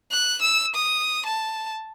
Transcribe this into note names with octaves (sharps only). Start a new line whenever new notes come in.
F#6
E6
D#6
A5